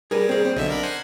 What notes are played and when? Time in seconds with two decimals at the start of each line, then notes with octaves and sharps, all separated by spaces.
0.11 G3 G#4 A#4 B4
0.29 C4 G#4
0.45 C4
0.56 B1 D3 D#5 E5
0.69 D4 A#4 B5
0.83 C5 F#5 G#5